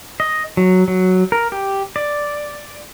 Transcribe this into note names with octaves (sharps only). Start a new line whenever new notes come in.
D#5
F#3
F#3
A#4
G4
D5